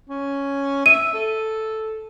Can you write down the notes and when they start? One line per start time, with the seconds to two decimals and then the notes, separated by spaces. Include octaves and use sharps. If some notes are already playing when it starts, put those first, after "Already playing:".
0.09 C#4
0.86 E5 D#7
1.14 A4